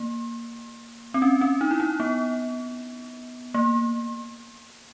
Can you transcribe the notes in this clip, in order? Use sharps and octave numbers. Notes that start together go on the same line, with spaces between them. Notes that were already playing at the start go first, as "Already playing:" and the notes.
Already playing: A#3
C4
C#4
C#4
D#4
E4
D#4
B3
A#3